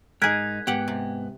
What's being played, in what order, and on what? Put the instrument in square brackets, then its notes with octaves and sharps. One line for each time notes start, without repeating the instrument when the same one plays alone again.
[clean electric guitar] G#2 D#4 [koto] G#4 A#4 [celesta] F#6 G#6 B6
[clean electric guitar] G#2 B3 [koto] G4 F#5
[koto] C3